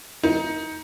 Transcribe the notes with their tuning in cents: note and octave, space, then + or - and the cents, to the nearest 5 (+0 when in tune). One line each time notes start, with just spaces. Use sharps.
D#4 +15